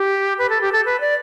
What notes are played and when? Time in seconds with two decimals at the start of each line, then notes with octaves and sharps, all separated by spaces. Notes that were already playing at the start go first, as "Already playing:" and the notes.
Already playing: G4
0.39 B4
0.50 A4
0.61 G4
0.72 A4
0.85 B4
1.00 D5